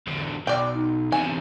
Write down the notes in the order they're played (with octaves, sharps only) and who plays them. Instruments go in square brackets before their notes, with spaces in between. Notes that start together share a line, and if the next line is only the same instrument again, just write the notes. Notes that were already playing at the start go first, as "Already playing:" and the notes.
[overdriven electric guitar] E2 D3
[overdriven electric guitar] B1 [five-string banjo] D5 G5
[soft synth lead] D#4
[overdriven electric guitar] E2 C3 [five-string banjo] G#5